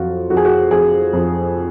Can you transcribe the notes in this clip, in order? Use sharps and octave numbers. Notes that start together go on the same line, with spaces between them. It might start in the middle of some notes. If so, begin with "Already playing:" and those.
Already playing: F2 F#3 F4 F#4
F2 F#4
G#4
F#4
F2 G#4
F2